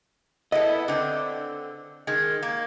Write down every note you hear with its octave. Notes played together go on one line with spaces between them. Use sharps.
B3 E4 A4 D#5
D3 C4
D#3 G#3
A#3